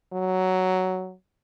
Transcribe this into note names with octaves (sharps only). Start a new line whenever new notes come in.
F#3